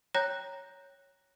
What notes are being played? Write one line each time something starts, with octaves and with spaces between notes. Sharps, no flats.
C#5 G5 A#5 F#6 G6 A#6